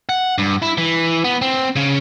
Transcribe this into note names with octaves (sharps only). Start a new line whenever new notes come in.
F#5
G2
E4
E3
B3
C4
C#3